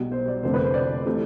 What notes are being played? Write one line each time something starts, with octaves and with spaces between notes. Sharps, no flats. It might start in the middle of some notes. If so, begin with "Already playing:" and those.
Already playing: B1 B2 G3
C5
D5
F1 F2 D3 A3 C5
B4
C5
D5
C5
C3 E3 A3